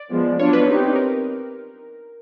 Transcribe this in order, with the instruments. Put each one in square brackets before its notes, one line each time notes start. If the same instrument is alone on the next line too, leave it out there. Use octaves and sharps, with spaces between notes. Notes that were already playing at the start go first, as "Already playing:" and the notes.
Already playing: [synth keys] D5
[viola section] F3 G#3 B3
[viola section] F#3 B3 D4 F4 [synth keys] C#5
[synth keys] B4
[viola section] C4 D#4 G4
[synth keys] A#4